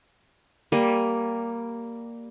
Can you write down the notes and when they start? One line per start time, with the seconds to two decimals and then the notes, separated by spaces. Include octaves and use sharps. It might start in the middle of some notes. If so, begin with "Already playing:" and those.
0.72 G3 A#3 G#5